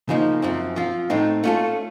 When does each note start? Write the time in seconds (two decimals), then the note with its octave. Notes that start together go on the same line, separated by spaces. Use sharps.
0.09 C#3 F3 A#3 D#4
0.42 F#2 F3 C4
0.76 F3 C4 F4
1.10 A2 A3 C4 D#4
1.44 A3 C#4 F4 A4